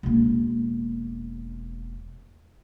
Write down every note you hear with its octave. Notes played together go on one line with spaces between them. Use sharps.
E1 A#3